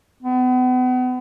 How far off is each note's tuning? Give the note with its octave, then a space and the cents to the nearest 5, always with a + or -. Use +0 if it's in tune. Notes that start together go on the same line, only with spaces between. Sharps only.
B3 +35